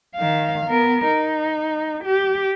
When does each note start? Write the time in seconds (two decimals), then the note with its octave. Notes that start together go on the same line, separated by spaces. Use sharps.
0.16 D#3 F5
0.66 B3 A#4
1.08 D#4
2.05 G4